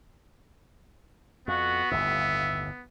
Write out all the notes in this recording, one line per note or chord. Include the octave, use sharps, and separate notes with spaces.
F2 B3 F#4
G1 D#2 A2 E5